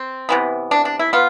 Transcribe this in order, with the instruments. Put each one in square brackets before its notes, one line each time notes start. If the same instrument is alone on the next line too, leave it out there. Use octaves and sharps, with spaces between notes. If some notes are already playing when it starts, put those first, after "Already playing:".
Already playing: [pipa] C4
C3 E3 B3
D4
D4
E4
B3 F4